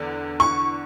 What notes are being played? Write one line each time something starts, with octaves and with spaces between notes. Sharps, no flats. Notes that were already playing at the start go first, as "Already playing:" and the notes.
Already playing: E2 D3
C#6